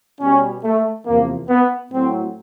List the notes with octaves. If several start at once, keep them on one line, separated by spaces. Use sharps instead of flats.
B2 G3 C#4
A3
E2 C3 F3 A#3
B3
A2 F#3 C4